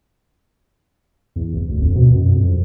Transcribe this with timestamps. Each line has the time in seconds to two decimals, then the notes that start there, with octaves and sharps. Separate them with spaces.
1.36 E2
1.54 F1
1.69 D2
1.81 F2
1.95 B2
2.15 F#2
2.35 F2